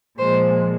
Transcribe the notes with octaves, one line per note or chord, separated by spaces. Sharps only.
A#2 F3 G#3 C5